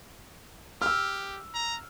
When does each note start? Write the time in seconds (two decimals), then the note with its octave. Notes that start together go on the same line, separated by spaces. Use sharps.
0.82 G4 E6 F6
1.54 A#5